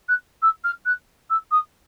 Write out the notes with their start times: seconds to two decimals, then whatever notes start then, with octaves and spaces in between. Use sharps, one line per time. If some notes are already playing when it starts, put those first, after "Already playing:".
0.09 F#6
0.42 E6
0.64 F6
0.86 F#6
1.30 E6
1.51 D#6